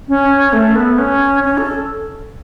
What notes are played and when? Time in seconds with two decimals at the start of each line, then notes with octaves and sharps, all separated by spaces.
0.09 C#4
0.53 A3
0.75 B3
0.98 C#4
1.44 C#4
1.58 A4